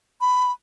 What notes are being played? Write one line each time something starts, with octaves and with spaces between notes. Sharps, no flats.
B5